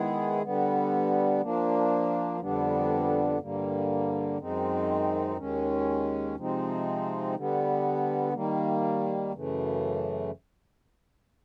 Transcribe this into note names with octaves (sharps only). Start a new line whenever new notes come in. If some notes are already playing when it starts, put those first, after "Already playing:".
Already playing: D#3 G#3 B3 E4 G#4
D3 G3 B3
F3 A#3 D4
F2 D3 G3 B3 D4
G2 D3 G3 A#3
F#2 D#3 G#3 C4 D#4
D#2 D#3 G#3 C#4
C3 F3 G#3 C4 D#4
D3 G3 B3
D#3 G3 A#3
F#2 C#3 E3 A3